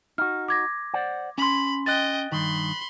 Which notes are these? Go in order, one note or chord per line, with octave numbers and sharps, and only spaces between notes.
D#4 F#4 F6
D6 G#6 A#6
C5 D5 F#5
C#4 B5 C6
D#5 G5 F#6 A6
G2 D#3 B5 C6